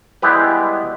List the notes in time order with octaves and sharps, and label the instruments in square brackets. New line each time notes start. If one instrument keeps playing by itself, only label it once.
[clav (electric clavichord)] G3 G#3 B3 E4 G4 B4